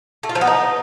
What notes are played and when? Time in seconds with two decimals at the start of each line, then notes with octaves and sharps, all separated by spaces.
0.23 A3
0.29 F4
0.35 F3
0.41 B3
0.47 D#4